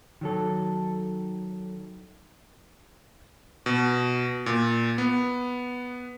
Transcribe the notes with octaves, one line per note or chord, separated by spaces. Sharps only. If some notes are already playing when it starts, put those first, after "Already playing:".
D#3 F#3 A4
B2
A#2
B3